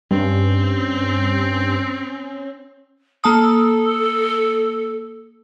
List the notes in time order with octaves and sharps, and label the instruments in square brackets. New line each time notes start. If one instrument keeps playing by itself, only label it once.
[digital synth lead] G2 [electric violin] C4 [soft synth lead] C#4
[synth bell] A#3 A5 D#6 [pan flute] A4